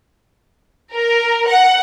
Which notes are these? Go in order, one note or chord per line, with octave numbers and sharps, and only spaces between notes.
A#4
F#5